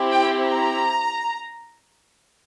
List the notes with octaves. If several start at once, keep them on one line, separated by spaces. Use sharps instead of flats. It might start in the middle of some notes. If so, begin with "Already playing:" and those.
Already playing: C4 E4 G4
G5
A#5